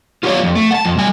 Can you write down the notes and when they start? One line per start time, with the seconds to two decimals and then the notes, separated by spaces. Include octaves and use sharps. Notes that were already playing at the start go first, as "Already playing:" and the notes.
0.23 F4 G4 A4 C#5 F5
0.43 F2
0.55 A3
0.71 F#5 A5
0.85 F2
0.98 G3 G#5